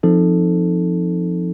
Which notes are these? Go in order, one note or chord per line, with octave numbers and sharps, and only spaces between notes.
F3 C4 D#4 A4